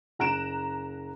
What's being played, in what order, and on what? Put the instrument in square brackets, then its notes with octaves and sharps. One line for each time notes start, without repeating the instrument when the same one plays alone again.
[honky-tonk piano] F#1 A#5 F#6 D7 E7